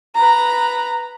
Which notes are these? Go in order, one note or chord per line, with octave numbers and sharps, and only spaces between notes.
B4 A#5